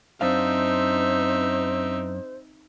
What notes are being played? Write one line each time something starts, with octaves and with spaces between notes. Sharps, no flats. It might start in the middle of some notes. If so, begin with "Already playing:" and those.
F#2 C4 D4 D#4 C5 E5 F5